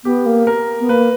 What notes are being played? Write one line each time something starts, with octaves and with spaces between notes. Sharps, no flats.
B3 G4
A#3
A#4
B3
A#3 B4